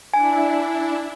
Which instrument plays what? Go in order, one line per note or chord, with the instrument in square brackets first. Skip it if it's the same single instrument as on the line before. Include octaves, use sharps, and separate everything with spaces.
[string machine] D4 E4 [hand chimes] G#5